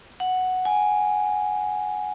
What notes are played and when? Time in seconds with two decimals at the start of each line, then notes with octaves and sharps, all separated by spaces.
0.20 F#5
0.65 G#5